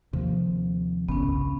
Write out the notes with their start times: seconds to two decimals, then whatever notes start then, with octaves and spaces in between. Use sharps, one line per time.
0.13 D#2 C3 F3
1.09 G1 C2 C#3 B3 C#4